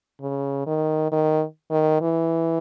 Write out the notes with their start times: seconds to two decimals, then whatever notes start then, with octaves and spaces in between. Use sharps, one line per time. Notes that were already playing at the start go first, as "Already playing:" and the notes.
0.21 C#3
0.66 D#3
1.12 D#3
1.71 D#3
2.01 E3